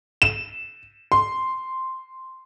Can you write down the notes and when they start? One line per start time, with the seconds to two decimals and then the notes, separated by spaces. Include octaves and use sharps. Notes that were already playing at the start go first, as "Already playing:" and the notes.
0.22 E7
1.12 C6